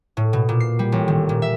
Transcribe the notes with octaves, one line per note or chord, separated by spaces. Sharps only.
A2
B2
A#2
C7
G3
A1
D#3
A#2
E5